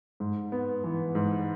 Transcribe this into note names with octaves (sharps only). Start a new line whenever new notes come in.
G#2
B3
E3
G#2